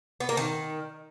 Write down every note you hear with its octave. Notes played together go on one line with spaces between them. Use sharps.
B3
A#3
D#3